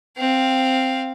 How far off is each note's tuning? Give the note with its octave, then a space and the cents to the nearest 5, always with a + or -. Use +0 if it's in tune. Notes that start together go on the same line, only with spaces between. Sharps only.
C4 +0 F5 +0